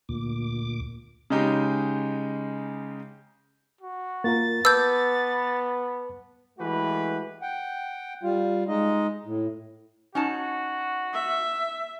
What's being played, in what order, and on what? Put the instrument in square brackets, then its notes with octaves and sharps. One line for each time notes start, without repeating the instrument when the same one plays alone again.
[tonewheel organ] D2 A#2 D6
[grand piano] C#3 G#3 D#4 G4
[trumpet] F#4
[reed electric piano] A#3 F4 A#4 [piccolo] A6
[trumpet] B3 [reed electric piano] B4 A5 D6 [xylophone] E6 G6
[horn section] E3 G#3 A3 F#4 G4 B4
[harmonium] F#5 G5
G3 F4
G#3 D#4 D#5
A2
[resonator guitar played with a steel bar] C#4 D#4 A5 [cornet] F#4
[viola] E5